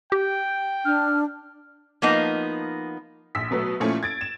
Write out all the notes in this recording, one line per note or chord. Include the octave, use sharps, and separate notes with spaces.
G4 G5
D4 F6
F3 A#3 B3 D#4
A#1 E6 B6
B2 F#3 A3 B3
A#2 F3 A3 C#4 E4
G#6 A6 D7
E7